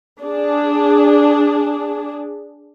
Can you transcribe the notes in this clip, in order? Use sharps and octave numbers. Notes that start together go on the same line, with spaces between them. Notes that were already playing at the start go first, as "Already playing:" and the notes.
D4 G#4